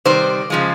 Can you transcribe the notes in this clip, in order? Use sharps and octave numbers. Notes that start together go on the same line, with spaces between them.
C3 D#3 G3 C5
C#3 F3 G#3